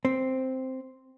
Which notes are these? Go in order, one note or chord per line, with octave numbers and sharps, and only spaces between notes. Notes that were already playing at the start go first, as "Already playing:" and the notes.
C4